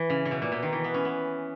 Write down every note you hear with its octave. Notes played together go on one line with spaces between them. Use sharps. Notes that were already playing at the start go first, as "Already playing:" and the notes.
Already playing: E3
C#3
C#3
B2
A#2
B2
D#3
E3
B3
C#4
B3